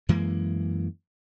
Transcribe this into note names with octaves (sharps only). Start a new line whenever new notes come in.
F#2 E3 G#3 A#3